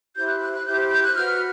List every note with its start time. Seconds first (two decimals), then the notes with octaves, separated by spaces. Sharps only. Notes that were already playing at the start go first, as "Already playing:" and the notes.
0.16 E4 G4 C5 G6
0.28 F#6
0.41 F#6
0.53 F#6
0.66 E4 G4 C5 G6
0.91 G6
1.03 F#6
1.15 F#4 B4 F6